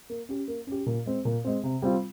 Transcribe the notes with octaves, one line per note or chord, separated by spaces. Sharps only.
A#3
C#4 G4
A#3
C#4 G4
A#2
G#3 C4
A#2
G#3 C4
C3
G3 C4 F4